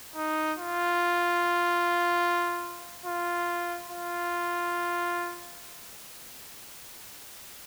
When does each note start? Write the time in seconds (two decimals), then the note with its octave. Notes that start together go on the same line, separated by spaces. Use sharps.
0.16 D#4
0.58 F4
3.06 F4
3.89 F4